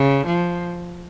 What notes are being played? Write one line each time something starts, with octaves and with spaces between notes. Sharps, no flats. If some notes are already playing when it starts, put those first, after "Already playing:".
Already playing: C#3
F3